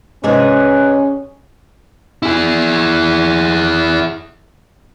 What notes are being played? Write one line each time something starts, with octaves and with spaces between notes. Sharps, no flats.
G#2 C3 C#4 D#4 G#4 B4
E4 G#4